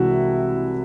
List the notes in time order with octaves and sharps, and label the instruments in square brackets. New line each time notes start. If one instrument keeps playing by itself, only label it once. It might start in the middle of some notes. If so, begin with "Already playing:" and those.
Already playing: [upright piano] C2 C3 E3 G#3 E4 F#4